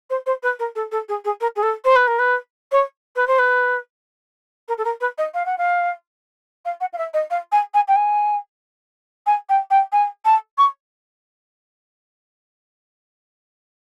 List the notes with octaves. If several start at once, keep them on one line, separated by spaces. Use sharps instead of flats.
C5
C5
B4
A#4
A4
A4
G#4
G#4
A#4
G#4
A4
C5
B4
A#4
B4
C#5
B4
C5
B4
A#4
A4
A#4
B4
D#5
F5
F#5
F5
F5
F#5
F5
E5
D#5
F5
G#5
G#5
G5
G#5
G#5
G5
G5
G#5
A5
C#6